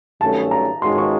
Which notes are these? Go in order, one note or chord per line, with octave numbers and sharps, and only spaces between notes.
G2 D#3 F#3 A3 C#4 A5
A#5
G#2 D#3 G#3 C#4 F#4 C6
C#6